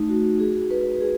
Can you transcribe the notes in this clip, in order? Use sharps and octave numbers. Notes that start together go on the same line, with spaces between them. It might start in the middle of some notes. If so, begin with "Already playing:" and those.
Already playing: A3 D#4
F#4
G#4
B4
G#4